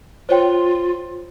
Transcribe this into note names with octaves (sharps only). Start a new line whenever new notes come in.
F4 C5 C#5 G5